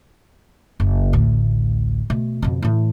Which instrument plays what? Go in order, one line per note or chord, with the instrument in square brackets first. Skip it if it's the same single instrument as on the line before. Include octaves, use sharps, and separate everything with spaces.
[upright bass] F#1
A1 D2
B2 A3
F2 B2
A2 E3